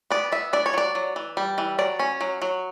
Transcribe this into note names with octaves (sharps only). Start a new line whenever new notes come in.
B3 D5
B3 E5
D4 D5
C#5
F#3 D5
F#3
E3
G3
E3
F#3 D5
C#4
F#3
F#3